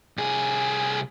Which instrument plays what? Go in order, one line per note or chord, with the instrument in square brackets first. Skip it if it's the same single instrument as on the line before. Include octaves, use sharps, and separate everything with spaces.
[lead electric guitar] C2 G#4